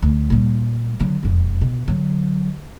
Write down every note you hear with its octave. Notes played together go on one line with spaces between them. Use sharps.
D2
A#2 G3
D3 F#3
E1 F2
B2
D3 F#3